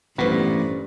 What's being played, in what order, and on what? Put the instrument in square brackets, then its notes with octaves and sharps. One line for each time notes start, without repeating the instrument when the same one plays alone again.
[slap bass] A1 A#2 [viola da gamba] G2 [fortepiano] B3 [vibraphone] C#4 A4 C5